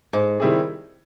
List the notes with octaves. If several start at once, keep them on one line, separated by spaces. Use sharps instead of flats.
G#2
D#3 G3 C4 E4 G#4